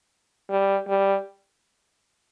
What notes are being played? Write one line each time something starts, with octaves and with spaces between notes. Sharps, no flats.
G3
G3